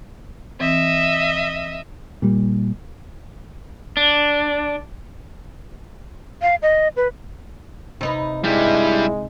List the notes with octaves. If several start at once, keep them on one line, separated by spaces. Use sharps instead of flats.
E3 C4 D#5 E5
A#2 G3
D4
F5
D#5
B4
C3 D#4 B4
G2 G3 G#3 E4